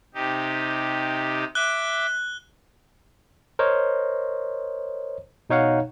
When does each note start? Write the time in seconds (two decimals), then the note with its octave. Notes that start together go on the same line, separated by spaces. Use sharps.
0.14 C3 D#4 G4
1.55 E5 D6 F#6 G7
3.59 A#4 C5 C#5 D#5
5.50 B2 D#4 C#5 F5 F#5